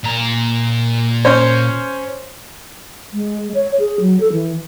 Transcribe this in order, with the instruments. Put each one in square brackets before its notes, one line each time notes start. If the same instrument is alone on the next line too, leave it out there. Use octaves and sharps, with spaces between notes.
[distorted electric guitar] A#2 A#5
[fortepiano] C#4 C5 C#5
[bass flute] G#3
C#5
G#4
F#3
A4
E3